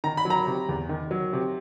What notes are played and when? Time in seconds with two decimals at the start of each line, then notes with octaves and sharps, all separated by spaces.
0.04 D#3 A#5
0.17 B5
0.25 F#3
0.30 A#5
0.47 C3
0.69 E2
0.89 D#3
1.11 F#3
1.33 C3